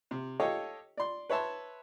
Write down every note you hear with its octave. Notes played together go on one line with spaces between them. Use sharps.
C3
G4 A4 C#5 D#5 F5 G5
D5 C6
B4 C#5 E5 A5 C6